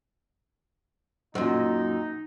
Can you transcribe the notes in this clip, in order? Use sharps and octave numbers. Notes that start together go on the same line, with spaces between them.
F#2 A#2 D#4